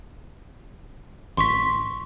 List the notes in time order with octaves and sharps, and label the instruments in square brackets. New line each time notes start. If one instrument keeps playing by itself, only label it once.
[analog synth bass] A1 [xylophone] C6 C#6 B6